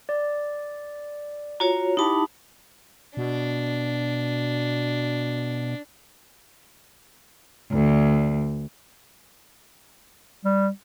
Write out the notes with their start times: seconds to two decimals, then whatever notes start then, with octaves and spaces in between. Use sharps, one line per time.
0.09 D5
1.60 F4 F#4 C#5 A#5
1.97 D#4 E4 G4 A5 B5
3.17 B2 D4
7.70 D2
10.45 G3